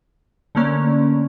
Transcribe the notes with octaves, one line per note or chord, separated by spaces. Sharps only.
D3 A3 A#3 C#4